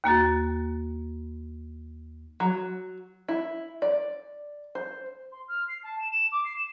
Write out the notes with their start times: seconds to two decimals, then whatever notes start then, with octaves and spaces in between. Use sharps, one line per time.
0.04 D#2 A#3 F#4 A6
2.40 F#3
3.28 E4
3.82 D5
4.75 C5
5.32 C6
5.48 F6
5.68 C7
5.84 A5
5.99 E7
6.11 E7
6.32 D6
6.45 C7
6.56 E7